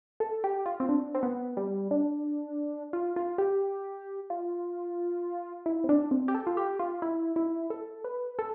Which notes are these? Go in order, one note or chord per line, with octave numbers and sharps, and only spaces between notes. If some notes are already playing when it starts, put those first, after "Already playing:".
A4
G4
F4
C4
D4
C4
B3
G3
D4
F4
F4
G4
F4
E4
C4
D4
C4
G4
A4
F4
G4
F4
E4
E4
A4
B4
A4